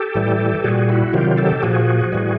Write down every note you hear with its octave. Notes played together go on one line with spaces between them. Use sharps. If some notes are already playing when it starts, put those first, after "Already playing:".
Already playing: G4 A4
A2 E3 G3
A#2 G3 F#4 G#4
E4 F#4
C3 D#3 F#3 F4 G4
G4 A4
A#2 F3 F#4 G#4
A2 E3 G3